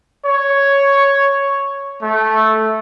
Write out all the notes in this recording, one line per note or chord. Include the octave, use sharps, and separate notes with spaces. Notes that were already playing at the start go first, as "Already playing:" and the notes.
C#5
A3